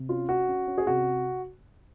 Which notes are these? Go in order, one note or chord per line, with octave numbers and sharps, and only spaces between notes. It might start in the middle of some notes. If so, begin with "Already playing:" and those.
Already playing: C3
C#4 F4
C#4 F#4
C#4
C#4
G#4
C3 F#4